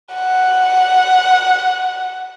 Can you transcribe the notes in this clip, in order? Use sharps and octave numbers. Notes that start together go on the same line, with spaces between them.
F#5